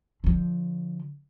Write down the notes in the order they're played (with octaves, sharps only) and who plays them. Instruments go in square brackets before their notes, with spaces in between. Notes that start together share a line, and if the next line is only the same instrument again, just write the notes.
[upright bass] D3 F3